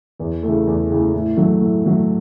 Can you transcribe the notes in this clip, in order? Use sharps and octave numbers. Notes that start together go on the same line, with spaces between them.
E2
C#3 E3 A3
E2
C#3 E3 A3
A2
F#3 A3
A2
F#3 A3